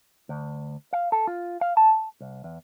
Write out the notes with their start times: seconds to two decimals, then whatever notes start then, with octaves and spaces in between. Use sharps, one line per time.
0.29 D2
0.93 F5
1.12 A4
1.27 F4
1.61 F5
1.77 A5
2.21 C2
2.44 E2